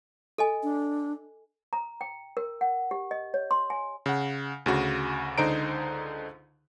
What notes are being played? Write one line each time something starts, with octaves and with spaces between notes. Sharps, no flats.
A4 D#5 G#5
D4
A#5
G5
A#4
F#5
G4
D#5
C#5
C6
G#5
C#3 F#5
D2 C#3 F#4
C#2 D3 D#4 C5 A#5 D7